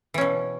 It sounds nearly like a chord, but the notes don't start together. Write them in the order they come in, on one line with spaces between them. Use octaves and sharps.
E3 C#4 B2